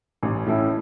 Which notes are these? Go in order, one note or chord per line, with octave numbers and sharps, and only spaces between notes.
A1
A2 A3 C#4 E4